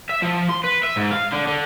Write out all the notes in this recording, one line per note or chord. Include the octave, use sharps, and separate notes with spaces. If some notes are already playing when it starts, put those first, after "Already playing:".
E5
F3
C6
B4
E5
G#2
F5
D3
D3